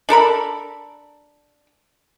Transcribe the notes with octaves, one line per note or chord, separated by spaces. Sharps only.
D4 A4 A#4 B5